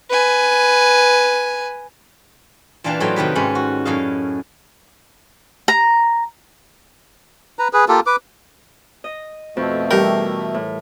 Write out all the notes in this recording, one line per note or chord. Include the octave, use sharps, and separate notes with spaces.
B4 G#5
A#2 E3 D4 F5 G5 A5
A2 F#3 D#4 C5 F5 G5
C3 D#3 G4 B4
G#2 D#3 C#4 B5
F#4
F#2 A2 D#5 F5
A#5
B4 A#5
G#4 B4
A#3 F4 G4 A4
B4 D6
D#5
F2 B2 A3
E3 G3 G4 A#4 G5
A2